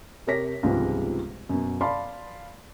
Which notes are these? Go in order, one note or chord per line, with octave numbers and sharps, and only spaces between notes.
C3 G4 A#4 C#5 A#6 B6
C#2 G#2 C3 F3 G3 B3
F#2 B2
D5 F5 A5 B5 C6